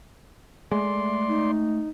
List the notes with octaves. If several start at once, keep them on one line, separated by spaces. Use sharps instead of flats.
G#3 A3 D5 C6
D#4